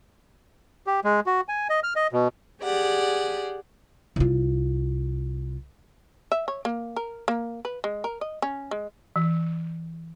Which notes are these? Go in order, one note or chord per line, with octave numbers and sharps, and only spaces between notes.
G4
G#3
F#4
G#5
D#5
F6
D#5
B2
G4 G#4 D5 F#5
C2 F4
E5
C#5
A#3
A#4
A#3
B4
G#3
A#4
D#5
C#4
G#3
E3